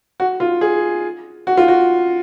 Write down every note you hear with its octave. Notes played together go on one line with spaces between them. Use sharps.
F#4
F4
G#4
F#4
F4
F#4